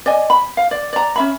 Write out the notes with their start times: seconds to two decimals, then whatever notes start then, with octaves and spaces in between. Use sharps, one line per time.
0.06 D5 D#5 G#5
0.30 B5
0.57 F5
0.71 D5
0.93 D5 A#5
1.16 C#4 E5 B5